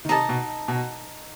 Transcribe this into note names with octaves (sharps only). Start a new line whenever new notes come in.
D#3
C3 D#4 A4 D#5 A5
B2
B2